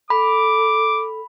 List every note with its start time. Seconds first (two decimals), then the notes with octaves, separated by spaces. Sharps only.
0.10 A4 B5 D6